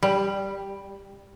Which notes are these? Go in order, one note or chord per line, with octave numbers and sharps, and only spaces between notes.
G3